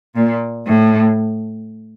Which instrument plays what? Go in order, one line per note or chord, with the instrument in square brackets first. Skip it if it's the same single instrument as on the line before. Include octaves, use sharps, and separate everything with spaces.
[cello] A#2
A2